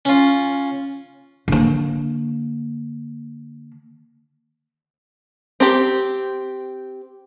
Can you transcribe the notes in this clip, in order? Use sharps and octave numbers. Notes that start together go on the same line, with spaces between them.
C#4 F4
D3 A#3
C4 G4